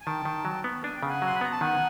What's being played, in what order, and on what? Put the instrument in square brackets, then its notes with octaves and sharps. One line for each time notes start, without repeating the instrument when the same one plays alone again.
[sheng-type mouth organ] G#5
[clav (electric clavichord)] D#3 [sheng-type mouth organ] G5 A5
[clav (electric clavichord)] D#3
F#3
B3
[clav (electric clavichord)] D4 [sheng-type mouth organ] G#5
[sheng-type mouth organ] G5
[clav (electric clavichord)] C#3
[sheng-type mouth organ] F#5 G#5
[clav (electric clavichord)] F#3 [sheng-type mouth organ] C6
[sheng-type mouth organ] B5
[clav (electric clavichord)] B3 [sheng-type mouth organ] A#5
[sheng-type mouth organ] A5
[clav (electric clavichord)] D#3 [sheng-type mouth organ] F#5 G#5